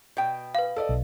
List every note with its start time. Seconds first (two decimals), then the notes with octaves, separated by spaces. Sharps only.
0.17 B2 G5
0.55 B4 F5
0.76 A4 D5 D#5
0.89 B1